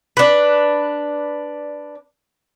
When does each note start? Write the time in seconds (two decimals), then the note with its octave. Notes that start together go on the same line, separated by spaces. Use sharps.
0.17 D4 B4